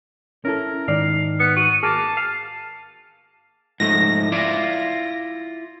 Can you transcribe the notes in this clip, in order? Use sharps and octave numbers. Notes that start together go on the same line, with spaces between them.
C#4 E4 A4 A#4
G#2 D#3 D5 F5
B3 C#7
F#4 D#7
A#3 G#4 A5
F5
G#2 F3 A3 A#6
E4 F4 D5